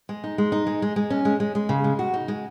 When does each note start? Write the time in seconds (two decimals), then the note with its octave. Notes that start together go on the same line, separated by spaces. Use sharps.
0.09 G#3
0.24 D#4
0.38 G#3
0.52 D#4
0.67 G#3
0.82 G#3
0.96 G#3
1.10 C#4
1.25 G#3
1.40 G#3
1.55 G#3
1.69 C#3
1.84 G#3
1.99 F#4
2.14 D#4
2.28 G#3